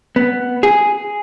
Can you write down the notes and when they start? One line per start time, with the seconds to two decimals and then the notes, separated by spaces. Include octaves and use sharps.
0.16 B3
0.63 G#4